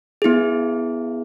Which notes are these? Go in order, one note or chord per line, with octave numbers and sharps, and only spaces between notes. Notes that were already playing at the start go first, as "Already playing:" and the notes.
B3 E4 G#4